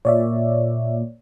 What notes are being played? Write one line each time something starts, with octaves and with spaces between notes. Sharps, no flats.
A#2 C#5 D5 E5